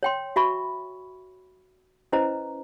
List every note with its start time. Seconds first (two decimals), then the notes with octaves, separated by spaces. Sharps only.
0.03 C#5 G5 C6
0.36 F#4 E5 B5 C#6
2.12 C#4 E4 B4 C5 D#5 A#5